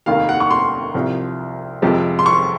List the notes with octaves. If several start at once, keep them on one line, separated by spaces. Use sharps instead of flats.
F1 D#2 D#3 F5
F#5
C#6
C6
C2 C3 F3
F2 C3 F3 G#3
C6
C#6